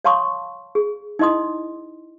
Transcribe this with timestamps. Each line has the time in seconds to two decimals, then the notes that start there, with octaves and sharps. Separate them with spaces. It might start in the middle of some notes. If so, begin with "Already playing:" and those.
0.05 C#5 F5 A5 C6 C#6 D#6
0.75 G#4
1.19 D#4 E4 D#5 C6 D#6